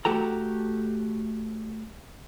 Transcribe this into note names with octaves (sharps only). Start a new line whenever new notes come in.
A3 F#4 G4 A4 A#5